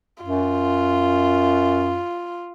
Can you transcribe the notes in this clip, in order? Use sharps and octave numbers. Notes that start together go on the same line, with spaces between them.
F#2 F4